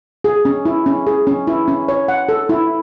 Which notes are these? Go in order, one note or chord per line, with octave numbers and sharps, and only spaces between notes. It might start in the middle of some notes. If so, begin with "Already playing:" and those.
G#4
C#4
E4
C#4
G#4
C#4
E4
C#4
C#5
F#5
A4
E4